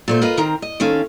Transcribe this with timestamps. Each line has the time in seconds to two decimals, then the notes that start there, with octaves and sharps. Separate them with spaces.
0.08 A#2 A3 C5
0.21 F4 A#4 B4 D#5 F5
0.37 D#3 C4 A#4
0.62 D#5
0.80 D#3 C4 C#4 A4 F5